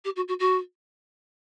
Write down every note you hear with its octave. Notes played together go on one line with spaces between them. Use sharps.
G4
F#4
F#4
F#4